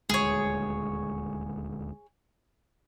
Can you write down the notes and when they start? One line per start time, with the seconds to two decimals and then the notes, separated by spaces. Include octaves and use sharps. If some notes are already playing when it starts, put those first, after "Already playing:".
0.09 D#1 D2 G#3 G#4 C#5